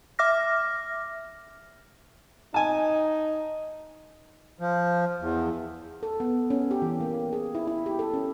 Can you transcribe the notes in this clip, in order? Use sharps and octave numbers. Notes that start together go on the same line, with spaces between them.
E5 D6 F6 A#6
D#4 G#5 A5
F3
E2
A4
B3
C#4
G4
E3
A#3
G#4
E4
E4
G4
A4
C#4